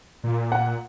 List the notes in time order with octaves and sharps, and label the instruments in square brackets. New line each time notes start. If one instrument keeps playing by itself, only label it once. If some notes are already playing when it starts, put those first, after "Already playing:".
[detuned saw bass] A#2
[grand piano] F#5